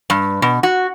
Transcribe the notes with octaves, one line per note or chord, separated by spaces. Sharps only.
G2
B2
F#4